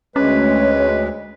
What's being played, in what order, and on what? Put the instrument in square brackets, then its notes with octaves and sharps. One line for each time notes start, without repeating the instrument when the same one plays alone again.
[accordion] D2 G#3 [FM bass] C#4 [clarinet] B4 [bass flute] C#5